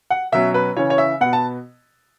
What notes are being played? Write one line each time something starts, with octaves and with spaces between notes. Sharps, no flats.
F#5
B2 F#3 C#4 E5
B4
C#3 E3 C#4 C#5
C#5
E5
B2 B3 F#5
A5